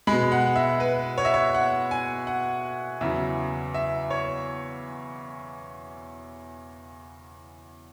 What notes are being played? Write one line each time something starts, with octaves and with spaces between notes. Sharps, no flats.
B2 G#3 B5
F#5
E5
B4
C#5
E5
C#5
F#5
G#5
F#5
E2 C#3 F#3 E5
E5
C#5